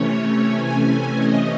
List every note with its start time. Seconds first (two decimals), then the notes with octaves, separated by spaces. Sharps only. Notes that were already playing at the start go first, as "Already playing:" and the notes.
Already playing: C3 E3 A3 C#4 C#5
0.49 G#5
0.82 G#5
1.16 D#5